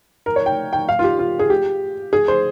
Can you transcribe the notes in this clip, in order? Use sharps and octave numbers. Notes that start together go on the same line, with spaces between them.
A#4
C#5
G5
G5
F5
F4
G4
F4
G#4
G4
G#4
C5